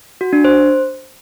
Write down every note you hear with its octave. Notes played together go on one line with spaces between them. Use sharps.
F#4
D4
C5